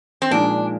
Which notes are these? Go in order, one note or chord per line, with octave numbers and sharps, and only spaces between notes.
C4
A#2 F3 G#3 D4 D#4